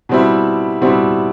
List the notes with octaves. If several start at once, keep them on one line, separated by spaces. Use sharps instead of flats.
B2 G3 C4 E4
B2 G3 C4 E4